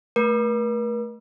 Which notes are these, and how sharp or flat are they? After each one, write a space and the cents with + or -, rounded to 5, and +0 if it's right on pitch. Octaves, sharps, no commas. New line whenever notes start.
A3 +0 A#4 +45